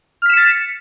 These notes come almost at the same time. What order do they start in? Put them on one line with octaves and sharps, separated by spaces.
F6 B6 E7 C#7 A6